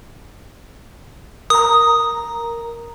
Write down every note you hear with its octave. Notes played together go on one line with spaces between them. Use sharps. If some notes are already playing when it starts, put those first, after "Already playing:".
A#4 A#5 D#6